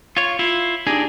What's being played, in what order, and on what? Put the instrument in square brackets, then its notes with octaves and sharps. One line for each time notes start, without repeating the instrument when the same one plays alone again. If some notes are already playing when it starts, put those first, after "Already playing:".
[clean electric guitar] F4 C#5
[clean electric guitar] E4 [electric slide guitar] F4
[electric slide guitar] D4 D#4 G4 [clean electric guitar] G#4